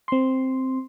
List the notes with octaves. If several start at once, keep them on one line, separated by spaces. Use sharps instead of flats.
C4 C6